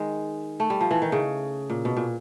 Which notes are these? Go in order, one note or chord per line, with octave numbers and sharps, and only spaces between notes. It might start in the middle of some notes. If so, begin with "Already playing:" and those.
Already playing: D#3 G#3
A3
G3
F3
E3
D#3
C#3
A#2
B2
A#2